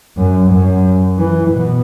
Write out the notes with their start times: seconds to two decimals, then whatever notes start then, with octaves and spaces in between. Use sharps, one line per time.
0.18 F#2
0.51 F#2
1.19 E3
1.52 B2